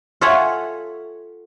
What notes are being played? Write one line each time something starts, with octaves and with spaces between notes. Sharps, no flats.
F4 A4 C#5 E5 F#5 G#5